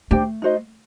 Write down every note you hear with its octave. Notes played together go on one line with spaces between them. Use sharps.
A3 D4 G4 C5 G5
D#4 F#4 C5 D#5